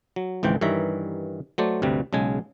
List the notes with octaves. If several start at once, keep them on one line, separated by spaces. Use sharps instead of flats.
F#3
G#1 C#2 E3 C5 G5
G2 D#3 E3 C#5 E5 A#5
F#3 A3 C5 D5
D2 G2 C3 G3
B1 C#3 G#3 G#5